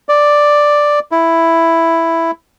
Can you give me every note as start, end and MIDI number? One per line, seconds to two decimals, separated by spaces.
0.09 0.99 74
1.12 2.31 64